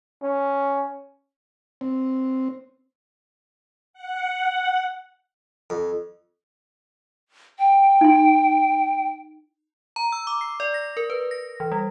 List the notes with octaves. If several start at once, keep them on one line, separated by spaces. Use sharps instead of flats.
C#4
C4
F#5
F2
G5
D#4 C6
A#5
E6
D6
C7
D5
A#6
A#4
B4
A#6
E3
G3